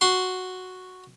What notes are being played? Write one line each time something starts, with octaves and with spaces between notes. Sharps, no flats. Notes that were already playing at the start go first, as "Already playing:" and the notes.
F#4 C6